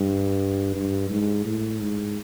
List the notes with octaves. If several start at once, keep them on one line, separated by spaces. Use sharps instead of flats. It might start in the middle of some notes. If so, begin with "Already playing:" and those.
Already playing: G2
G2
G#2
A2
G#2